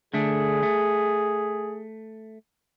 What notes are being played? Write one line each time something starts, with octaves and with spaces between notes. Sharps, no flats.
D3 A3 D4 G#4
A3